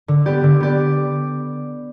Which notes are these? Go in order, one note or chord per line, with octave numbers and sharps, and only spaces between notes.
D3
B3 G4 D5
D3
B3 G4 D5